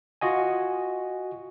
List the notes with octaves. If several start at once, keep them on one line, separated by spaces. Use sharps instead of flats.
F4 F#4 D#5 G#5